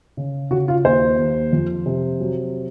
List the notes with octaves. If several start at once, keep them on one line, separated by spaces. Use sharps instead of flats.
C#3
C#3 F#4
F4
D#2 C5
D#2
F2
C3
F#3